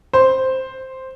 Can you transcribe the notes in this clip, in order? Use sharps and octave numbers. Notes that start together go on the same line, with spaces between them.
C5